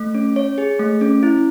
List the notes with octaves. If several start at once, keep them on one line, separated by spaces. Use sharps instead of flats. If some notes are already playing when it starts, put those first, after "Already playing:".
Already playing: A3
C#4
C#5
G#4
A3
C#4
E4